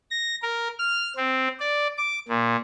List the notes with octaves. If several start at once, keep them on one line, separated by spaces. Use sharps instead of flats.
A#6
A#4
F6
C4
D5
D6
A#2